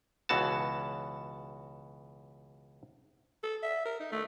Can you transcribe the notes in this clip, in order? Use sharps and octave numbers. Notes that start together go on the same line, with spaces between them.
C#2 B2 E3 F#4 A5
A4
E5
A#4
D#4
A3